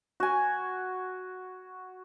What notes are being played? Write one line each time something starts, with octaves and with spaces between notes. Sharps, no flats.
F#4 G#5